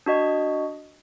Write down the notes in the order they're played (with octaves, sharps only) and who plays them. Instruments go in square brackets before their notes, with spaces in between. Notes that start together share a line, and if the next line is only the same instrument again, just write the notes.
[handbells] D4 F#4 D#5